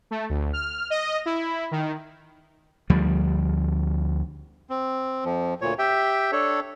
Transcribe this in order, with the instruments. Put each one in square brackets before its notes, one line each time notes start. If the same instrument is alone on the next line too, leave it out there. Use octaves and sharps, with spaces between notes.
[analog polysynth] A3
D2
F6
D#5
E4
D#3
[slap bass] D2 F3 G3
[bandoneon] C4
F2 F3
D2 A#2 C#5
G4 E5 G5
D4 A4 C#5